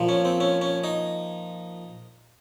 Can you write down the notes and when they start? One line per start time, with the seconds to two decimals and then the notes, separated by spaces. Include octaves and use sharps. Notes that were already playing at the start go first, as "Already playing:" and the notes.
Already playing: A#2 F3
0.09 C#4
0.25 C4
0.40 C#4
0.62 C#4
0.84 D#4